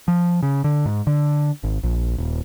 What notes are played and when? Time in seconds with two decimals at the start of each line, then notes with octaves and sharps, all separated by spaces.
0.08 F3
0.43 C#3
0.64 D3
0.86 G#2
1.07 D3
1.63 G#1
1.83 A#1
2.18 D#1